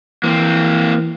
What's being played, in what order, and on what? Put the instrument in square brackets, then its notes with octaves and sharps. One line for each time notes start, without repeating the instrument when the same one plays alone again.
[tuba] E3 [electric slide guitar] A#3 C4